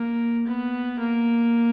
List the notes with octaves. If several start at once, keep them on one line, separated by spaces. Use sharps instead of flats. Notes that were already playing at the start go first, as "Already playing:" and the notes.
Already playing: A#3
B3
A#3